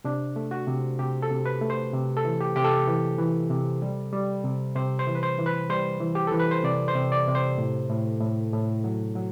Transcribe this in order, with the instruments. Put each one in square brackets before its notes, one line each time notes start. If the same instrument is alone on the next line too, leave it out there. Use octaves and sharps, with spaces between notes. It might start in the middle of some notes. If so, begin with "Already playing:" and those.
[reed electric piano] C3 D4
A3
F#4
C3
C3 G4
A4
C3
B4
A3
C5
C3
A4
E3
G4
C3 G4
A4
E3
E3
C3
G3
G3
C3
C3 C5
C5
E3
B4
C5
E3
B4
G3 C5
E3
G4
E3 A4
B4
C5
C3 D5
C5
C3
D5
C3
C5
A2
A2
A2
A2
F#3
F#3